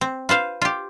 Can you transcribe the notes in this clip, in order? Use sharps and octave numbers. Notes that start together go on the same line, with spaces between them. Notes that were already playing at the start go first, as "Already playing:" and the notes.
C4
F4 B4 C5 F5
F4 G4